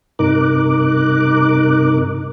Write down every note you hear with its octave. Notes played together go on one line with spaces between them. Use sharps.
G2 C3 D#4 A#4 D6 F#6